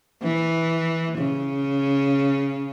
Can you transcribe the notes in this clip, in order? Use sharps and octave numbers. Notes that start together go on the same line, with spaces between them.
E3
C#3